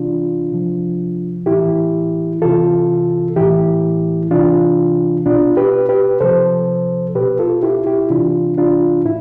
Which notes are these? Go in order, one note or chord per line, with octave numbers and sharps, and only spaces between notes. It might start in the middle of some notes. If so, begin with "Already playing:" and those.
Already playing: C3 E3 D4 F4
C3 F3
A2 E3 E4 G4
C3 E3 F4 A4
A2 E3 E4 G4
C3 E3 D4 F4
B2 D4 F4
G4 B4
G4 B4
C3 F3 A4 C5
B2 G4 B4
F4 A4
E4 G4
E4 G4
C3 E3 D4 F4
D4 F4
A2 E4